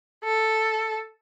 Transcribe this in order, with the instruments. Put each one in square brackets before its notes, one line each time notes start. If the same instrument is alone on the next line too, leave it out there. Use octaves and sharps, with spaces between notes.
[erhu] A4